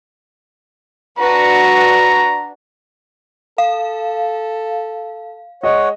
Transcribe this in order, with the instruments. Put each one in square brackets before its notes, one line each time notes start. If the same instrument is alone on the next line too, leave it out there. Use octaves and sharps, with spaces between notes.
[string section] D4 F#4 B4 [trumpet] A#5
[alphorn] A4 [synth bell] F5
[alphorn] G#3 [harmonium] C#5 F#5 [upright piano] D#5